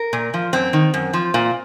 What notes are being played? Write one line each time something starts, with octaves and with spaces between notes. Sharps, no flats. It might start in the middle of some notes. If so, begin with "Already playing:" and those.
Already playing: A#4
A#2
F3
F#2 C4
D#3
F#2
F3
A#2